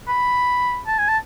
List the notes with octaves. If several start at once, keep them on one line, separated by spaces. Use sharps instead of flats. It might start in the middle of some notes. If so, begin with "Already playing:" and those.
B5
A5
G#5
A5